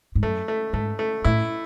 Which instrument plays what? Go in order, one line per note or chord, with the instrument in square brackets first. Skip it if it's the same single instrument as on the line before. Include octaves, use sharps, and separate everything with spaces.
[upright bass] G#2
[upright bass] F#2 [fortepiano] A3
[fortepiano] A3
[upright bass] G#2 [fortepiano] A3
[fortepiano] A3
[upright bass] A2 [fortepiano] E4